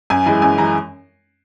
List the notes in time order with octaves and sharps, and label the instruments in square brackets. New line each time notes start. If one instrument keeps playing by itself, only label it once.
[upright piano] F#2 G#5
E3 G#3 G#5
F#2 G#5
E3 G#3 A#5